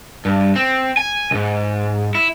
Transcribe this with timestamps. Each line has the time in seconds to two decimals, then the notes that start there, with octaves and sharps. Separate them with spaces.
0.25 G2
0.56 C4
0.97 G#5
1.31 C#2 G#2
2.15 E4